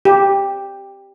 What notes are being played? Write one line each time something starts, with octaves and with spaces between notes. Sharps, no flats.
G4